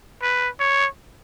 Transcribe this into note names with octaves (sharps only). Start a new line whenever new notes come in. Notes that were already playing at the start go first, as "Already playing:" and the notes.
B4
C#5